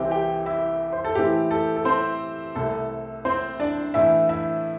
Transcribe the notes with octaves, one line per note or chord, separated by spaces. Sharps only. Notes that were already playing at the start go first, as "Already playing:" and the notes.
Already playing: C2 C3 E3 C4 E4 G4 G5
G4 G5
E4 E5
C5
A4
A2 E3 A3 C4 E4 G4
A4
A4
C4 C5
C2 C3 A3 A4
C4 C5
D4 D5
A2 E3 A3 D4 E4 E5
E4 E5